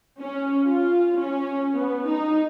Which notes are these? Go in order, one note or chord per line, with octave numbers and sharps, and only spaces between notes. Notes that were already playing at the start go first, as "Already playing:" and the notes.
C#4
F4
C#4
B3
D#4